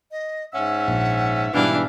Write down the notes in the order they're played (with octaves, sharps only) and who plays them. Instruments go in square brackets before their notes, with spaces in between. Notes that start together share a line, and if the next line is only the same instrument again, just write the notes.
[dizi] D#5
[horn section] G#2 C#4 E5 [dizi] F#5
[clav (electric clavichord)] A#1
[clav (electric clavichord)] G#2 B2 G3 [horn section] E3 [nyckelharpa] D4 F5